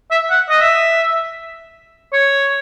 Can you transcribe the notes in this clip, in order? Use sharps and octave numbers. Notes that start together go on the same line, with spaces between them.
E5
F#5
D#5
E5
C#5